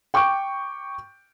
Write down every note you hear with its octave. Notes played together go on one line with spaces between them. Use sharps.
G5 C#6 D6 G6 D7